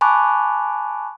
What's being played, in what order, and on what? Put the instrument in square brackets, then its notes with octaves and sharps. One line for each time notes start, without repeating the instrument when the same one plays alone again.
[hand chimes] G#5 A5 B5 C#6 D6 F#6